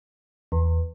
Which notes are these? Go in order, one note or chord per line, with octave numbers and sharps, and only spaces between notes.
E2